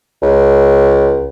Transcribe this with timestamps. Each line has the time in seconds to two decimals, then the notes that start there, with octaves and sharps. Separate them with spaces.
0.22 C#2